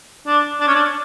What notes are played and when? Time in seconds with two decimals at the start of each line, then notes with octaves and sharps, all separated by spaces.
0.27 D4
0.60 D4
0.67 C#4
0.75 D4